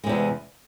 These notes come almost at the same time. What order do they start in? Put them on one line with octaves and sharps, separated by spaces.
G#3 C3 E2